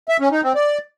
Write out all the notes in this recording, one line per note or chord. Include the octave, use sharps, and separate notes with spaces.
E5
C#4
D#4
C4
D5